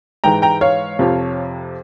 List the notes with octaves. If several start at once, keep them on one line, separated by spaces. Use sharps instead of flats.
G#2 E3 G#3 G5 A#5
G5 A#5
C#5 F5
F2 C3 F3